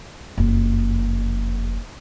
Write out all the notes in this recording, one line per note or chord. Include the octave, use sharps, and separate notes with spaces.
F#1 F2